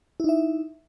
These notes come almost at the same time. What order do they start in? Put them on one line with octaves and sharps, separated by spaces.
E4 D#4 E5